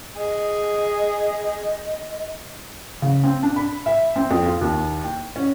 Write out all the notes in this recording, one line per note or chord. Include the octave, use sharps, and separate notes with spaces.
G#4 D#5
C#3
C4
D4
B5
E5
C4
F2
F4
D#2
G5
C#4